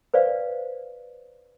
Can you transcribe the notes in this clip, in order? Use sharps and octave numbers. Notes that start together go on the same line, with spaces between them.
B4 C5 D5 F5